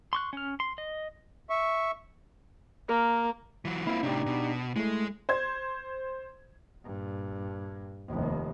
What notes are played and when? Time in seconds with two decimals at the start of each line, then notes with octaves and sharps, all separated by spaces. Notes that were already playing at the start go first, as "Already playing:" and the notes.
0.13 C6 C#6 F#6
0.33 C#4 F6
0.60 C6
0.78 D#5
1.50 E5 C#6
2.89 A#3 A#4
3.65 E3 F#3
3.87 A#3 C4 E4 F4
4.03 A2 C3 D4 D#4 G4
4.26 B2
4.76 A2 G#3 A3
5.29 C5 G#6
6.84 G2 A#2
8.09 F1 D#2